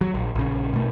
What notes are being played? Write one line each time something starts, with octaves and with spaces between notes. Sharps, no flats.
F#3
A#1
A#1 C#3
B2 A3